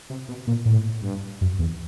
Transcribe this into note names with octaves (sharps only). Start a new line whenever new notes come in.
C3
B2
A#2
A2
G2
F#2
E2